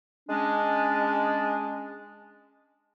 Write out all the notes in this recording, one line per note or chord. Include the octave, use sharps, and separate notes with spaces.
G#3 C#4 D4